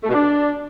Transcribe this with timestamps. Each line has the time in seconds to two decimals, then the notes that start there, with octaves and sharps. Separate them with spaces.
0.03 A3
0.08 B2
0.14 D4